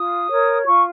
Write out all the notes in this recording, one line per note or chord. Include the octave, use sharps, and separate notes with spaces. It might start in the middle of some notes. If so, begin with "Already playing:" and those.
Already playing: F4 D#6
A#4 C#5
F4 C#6